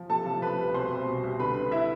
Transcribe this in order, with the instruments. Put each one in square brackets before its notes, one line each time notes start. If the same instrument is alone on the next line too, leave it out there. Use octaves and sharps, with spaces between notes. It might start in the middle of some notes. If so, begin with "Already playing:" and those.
Already playing: [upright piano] F3
C3 A4 A5
F3
F3 B4 B5
C2
B2 C5 C6
C2
B2
C2
D3 B4 B5
D3
E4 E5